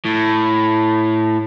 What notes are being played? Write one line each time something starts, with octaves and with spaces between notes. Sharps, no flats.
A2